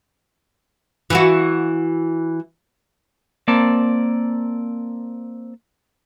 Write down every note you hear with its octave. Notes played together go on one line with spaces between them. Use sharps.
E3 E4 F#4
A#3 C4 D5 A5